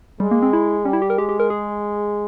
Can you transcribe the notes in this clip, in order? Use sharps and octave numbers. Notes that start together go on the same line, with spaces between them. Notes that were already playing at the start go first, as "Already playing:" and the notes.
G3 G#3
A#3
C4
E4
G3 C#4
E4
G4
A#4
G#3 G4
G4
A#4
G#4